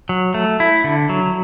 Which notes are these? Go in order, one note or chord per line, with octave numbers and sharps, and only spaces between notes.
F#3
A3
E4
D3
F#3